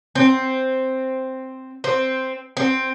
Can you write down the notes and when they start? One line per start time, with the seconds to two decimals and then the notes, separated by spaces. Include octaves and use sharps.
0.15 C4
1.84 C4
2.57 C4